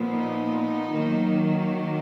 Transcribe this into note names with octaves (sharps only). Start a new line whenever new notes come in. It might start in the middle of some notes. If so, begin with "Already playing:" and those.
Already playing: A#2 F3 B3
D#4
D#3 F#3 A#3